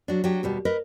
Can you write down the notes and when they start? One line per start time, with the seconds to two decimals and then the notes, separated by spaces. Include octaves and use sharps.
0.08 F#3 D4
0.24 F#3 D4 G4
0.43 D#2 B2 G3
0.65 A#4 B4 D#5